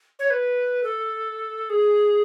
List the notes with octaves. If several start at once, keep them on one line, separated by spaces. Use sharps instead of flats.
C#5
B4
A4
G#4